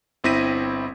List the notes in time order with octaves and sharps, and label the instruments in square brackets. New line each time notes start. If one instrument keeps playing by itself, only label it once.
[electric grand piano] G1 C4 E4 A#6 B6 D#7